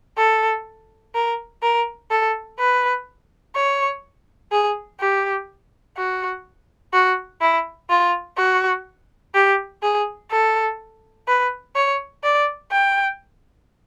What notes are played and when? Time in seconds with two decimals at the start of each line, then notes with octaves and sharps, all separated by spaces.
0.18 A4
1.15 A#4
1.63 A#4
2.11 A4
2.59 B4
3.56 C#5
4.52 G#4
5.00 G4
5.97 F#4
6.93 F#4
7.41 E4
7.90 F4
8.38 F#4
9.34 G4
9.82 G#4
10.31 A4
11.28 B4
11.75 C#5
12.24 D5
12.72 G5